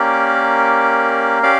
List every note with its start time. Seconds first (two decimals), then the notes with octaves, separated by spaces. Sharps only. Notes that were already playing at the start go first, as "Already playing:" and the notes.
Already playing: A#3 C#4 G4 A#4 D5
1.42 C#4 G4 D5 F5